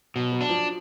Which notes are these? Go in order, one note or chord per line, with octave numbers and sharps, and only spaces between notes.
B2 F#3
F#3
D4
F3